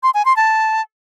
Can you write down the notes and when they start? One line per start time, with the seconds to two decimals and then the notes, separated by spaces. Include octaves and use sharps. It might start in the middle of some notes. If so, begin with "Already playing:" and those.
0.03 C6
0.14 G#5
0.25 C6
0.37 A5